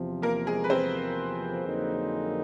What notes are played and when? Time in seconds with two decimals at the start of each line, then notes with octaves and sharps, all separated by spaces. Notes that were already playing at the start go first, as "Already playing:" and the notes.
Already playing: E2 C3 F3
0.22 A#3 A#4
0.46 G#3 G#4
0.64 B4
0.70 C4 C5
1.64 F2 D3 F#3 A#3 D#4